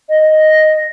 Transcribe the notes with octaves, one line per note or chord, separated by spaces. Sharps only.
D#5